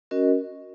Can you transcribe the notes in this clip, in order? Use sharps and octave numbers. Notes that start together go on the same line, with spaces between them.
C#4 F#4 A#4 D#5